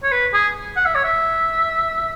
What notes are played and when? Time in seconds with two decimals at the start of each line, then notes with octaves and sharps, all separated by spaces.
0.03 C#5
0.12 B4
0.34 G#4
0.76 F#5
0.86 E5
0.95 C#5
1.04 E5